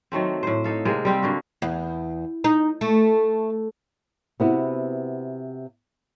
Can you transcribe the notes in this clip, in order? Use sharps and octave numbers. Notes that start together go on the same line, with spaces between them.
D#3 F#3 A3 C4
A2 C5
D#4 A4 F5
C3 G#3 A#3
G3 C4 G4
D3 A#3 F#4
E2
D#4
A3
C3 B3 E4 F#4